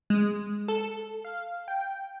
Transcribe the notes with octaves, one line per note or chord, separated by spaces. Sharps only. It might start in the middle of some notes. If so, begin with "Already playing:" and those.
G#3
A4
F5
G5